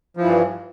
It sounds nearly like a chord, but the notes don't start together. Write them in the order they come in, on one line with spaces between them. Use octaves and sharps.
F3 E3 G2